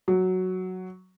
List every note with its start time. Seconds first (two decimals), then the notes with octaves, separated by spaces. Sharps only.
0.08 F#3